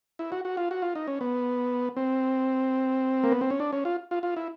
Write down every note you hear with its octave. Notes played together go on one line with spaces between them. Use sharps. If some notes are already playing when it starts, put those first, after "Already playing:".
E4
F#4
F#4
F4
F#4
F4
D#4
C#4
B3
C4
A#3
B3
C4
C#4
D4
C#4
F4
F4
F4
E4